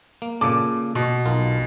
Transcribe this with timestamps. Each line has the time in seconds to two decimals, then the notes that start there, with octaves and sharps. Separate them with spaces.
0.22 A#3
0.41 A#2 C#3 A4 D6
0.95 B2
1.26 B1 F4 A#4